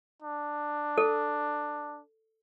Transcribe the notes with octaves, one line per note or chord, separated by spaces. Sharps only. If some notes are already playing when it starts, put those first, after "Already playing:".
D4
A4